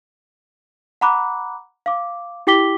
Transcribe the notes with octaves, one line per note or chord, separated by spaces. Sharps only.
F#5 A#5 B5 D6 F#6
F5 D6
E4 G4 G5 D6 B6 G7